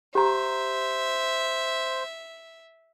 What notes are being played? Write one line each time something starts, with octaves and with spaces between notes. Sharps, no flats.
G4 C5 E5 A#5